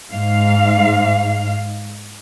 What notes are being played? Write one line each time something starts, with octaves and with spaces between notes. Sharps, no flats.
G#2 F5